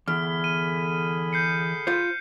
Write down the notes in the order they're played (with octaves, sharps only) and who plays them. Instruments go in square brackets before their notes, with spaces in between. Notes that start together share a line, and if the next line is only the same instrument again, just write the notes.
[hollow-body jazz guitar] E2 [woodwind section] D3 G#4 B5 [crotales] F6
[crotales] D#7
G6 C7 C#7
[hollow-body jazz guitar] F4 C5 [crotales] G6